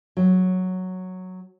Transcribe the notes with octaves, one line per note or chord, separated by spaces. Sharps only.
F#3